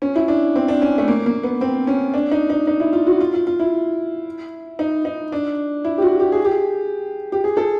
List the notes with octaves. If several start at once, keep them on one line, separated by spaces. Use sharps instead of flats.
C#4
E4
D4
C4
D4
C#4
A3
A#3
A#3
B3
C4
C#4
D4
D#4
D#4
D#4
E4
F4
F#4
F4
F4
F4
E4
D#4
D#4
D4
E4
G4
F#4
G4
G#4
G4
G4
G#4
A4